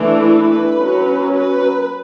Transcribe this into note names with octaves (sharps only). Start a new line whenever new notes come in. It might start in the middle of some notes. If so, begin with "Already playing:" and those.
Already playing: E3 A3 D4
B4
F#3 C#4
B4